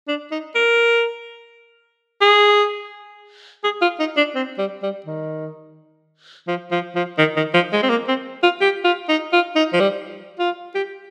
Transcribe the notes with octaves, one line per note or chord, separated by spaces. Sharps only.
D4
D#4
A#4
G#4
G#4
F4
D#4
D4
C4
G3
G3
D#3
F3
F3
F3
D#3
D#3
F3
G#3
C4
A#3
C4
F4
G4
F4
D#4
F4
D#4
F3
G3
F4
G4